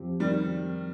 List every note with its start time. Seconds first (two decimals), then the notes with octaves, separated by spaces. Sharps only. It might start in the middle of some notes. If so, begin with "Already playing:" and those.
Already playing: F2 F3 C4 G4
0.20 D#3 G3